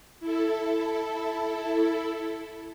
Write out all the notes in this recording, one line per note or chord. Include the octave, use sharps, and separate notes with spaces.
E4 A4